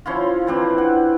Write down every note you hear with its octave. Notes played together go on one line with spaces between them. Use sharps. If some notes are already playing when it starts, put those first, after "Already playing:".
F3 C#4 E4 F4
E3 C4 D4
F#5